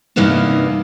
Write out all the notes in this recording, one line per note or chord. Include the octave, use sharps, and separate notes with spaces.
G2 C3 E3 A#3 B3 D#4